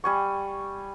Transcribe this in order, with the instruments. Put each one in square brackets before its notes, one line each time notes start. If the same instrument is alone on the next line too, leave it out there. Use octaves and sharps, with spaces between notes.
[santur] G3 G#5 C#6